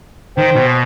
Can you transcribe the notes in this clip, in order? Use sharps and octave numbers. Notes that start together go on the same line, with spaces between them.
D#3 C5 G5
B2